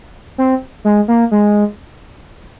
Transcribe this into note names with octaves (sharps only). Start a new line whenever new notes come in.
C4
G#3
A#3
G#3